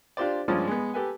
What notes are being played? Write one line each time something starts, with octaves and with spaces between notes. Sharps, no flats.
D4 F4 G4 C5 D5
G2 F3 G#3 C#4 D5 D#6
G#3 B3
G4 A4 B4 G#5